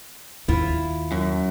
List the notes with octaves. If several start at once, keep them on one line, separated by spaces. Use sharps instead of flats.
D#2 E4 F4
F#2